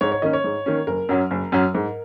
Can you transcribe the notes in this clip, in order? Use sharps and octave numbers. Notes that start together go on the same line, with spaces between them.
G#2 C#5
C#5
D#3 A#3 C#4 D#5
C#5
G#2
D#3 A#3 C#4
F#1 A#4
F#2 F#3 C#4
F#1
F#2 F#3 C#4
G#2